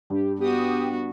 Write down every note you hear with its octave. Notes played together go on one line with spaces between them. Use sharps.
G2 G4
B3 F#4 G4 D#6